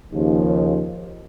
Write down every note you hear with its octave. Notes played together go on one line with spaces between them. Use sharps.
D#2 C#3 F3